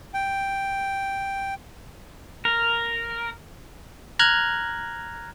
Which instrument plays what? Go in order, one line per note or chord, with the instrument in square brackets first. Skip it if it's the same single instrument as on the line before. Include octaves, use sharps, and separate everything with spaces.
[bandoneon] G5
[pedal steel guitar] A#4
[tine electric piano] A#5 F6 F#6 G#6